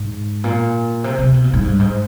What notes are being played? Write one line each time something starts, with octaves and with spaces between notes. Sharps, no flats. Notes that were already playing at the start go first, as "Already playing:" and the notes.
Already playing: G#2
A#2
C3
C3
B2
A#2
G#2
G2
G#2